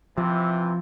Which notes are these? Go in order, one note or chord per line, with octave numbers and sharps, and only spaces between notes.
C3 E3 F3